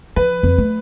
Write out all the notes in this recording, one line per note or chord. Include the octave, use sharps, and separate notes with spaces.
F3 B4
F2
F#3 A3